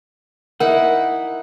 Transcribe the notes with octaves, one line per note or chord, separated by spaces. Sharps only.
D#4 E4 A#4 F#5